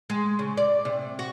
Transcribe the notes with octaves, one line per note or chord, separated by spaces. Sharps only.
G#3
C#3
D5
C3
F#4